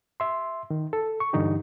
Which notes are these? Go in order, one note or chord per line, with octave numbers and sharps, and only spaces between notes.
E5 C6
D#3
A4
C#6
G2 D3 E3 D#4 G4